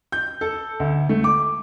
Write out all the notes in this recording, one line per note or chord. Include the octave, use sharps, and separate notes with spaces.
G6
A4
D2
A3
D6